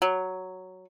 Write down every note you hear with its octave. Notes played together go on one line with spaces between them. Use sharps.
F#3